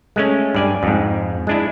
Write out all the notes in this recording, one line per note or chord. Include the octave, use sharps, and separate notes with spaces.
G#3 A3 C#4
G2 D5 G#5
F2 G#2
G#3 D4 E4